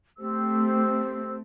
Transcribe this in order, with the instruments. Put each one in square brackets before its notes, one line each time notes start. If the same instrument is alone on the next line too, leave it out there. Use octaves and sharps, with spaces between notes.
[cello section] A3 C4 [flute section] G4 C5 E6